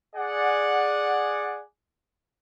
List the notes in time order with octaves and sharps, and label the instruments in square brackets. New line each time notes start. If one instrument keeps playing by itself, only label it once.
[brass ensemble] G#4 D5 F#5